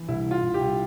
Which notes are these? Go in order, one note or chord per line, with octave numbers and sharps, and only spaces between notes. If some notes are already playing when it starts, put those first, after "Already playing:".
Already playing: E3
C2 E4
C2
F4
C2
G4
C2